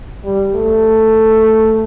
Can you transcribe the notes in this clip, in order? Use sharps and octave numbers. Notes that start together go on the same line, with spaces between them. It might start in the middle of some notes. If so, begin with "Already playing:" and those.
G3
A3